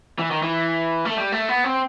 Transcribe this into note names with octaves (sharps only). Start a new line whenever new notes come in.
E3
D#3
E3
A3
G3
A3
B3
C4